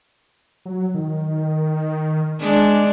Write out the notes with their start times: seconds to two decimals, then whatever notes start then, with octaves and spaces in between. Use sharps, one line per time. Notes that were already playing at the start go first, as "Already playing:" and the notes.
0.66 F#3
0.94 D#3
2.40 G#3 D4